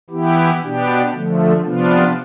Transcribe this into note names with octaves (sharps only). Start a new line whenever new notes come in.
E3 B3 E4 G4
B2 B3 D4 G4
D3 F3 A3
C3 F3 B3 D4 F4